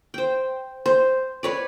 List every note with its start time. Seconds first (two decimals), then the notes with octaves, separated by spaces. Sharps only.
0.14 C5 G5
0.86 C5
1.43 B4 C#5 D5